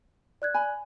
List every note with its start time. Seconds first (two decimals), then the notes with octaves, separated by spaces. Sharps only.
0.42 D5 F#6 G#6
0.54 G#5 B5